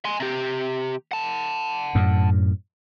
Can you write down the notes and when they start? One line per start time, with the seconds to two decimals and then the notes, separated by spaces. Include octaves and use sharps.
0.05 G#5 C6
0.20 C3 G4
1.12 F#5 A5
1.95 F#2 A2